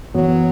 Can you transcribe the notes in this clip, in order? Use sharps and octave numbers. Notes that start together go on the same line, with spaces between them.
F#2 E3 F#3 B3 F#4